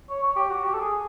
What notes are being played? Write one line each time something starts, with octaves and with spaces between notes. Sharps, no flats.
C#5
C#5
G4
F#4
G4
A4
G#4